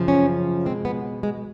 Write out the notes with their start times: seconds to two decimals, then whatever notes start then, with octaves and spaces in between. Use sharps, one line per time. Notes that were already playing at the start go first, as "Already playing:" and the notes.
Already playing: F#2 C#3 F3
0.08 C#4
0.66 G#3 C4
0.70 B2
0.85 B3
1.23 G#3